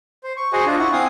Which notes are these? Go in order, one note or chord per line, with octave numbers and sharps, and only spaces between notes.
C5
C#6
F#4 G#4 C5 D#5 F#5 G#5
D4 F4
E4 F#5 C#6
C4 F5 G#5 D#6